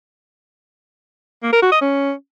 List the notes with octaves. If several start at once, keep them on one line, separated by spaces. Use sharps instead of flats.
A#3
A#4
F#4
D#5
C#4